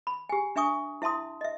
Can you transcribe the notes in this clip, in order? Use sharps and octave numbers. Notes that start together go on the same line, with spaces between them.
B5
G4 G#5
D4 E5 G#5 C#6 D#6
E4 E5 A5 C6 D#6
D#5 E5